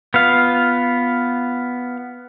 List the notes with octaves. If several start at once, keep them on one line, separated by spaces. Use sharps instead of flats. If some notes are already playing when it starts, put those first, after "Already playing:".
B3 F4 F5